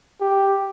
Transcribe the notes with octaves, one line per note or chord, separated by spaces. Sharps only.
G4